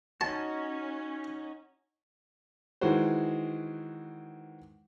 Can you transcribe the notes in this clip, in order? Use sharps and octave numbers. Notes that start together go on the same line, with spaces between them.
C#4 D#4 F#4 A5
D#3 E3 G#3 F#4 C5